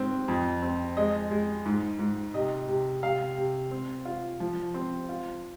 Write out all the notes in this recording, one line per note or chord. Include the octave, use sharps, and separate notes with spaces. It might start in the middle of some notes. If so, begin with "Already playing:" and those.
Already playing: G#2 C4
F2
C4
G#3 D#5
G#3
G#2
G#2
C3 D#5
C3
C3 F5
C3
C4
F4
F3
C4
F4